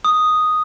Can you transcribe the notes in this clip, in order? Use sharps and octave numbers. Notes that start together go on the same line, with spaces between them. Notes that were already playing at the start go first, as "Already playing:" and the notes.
D#6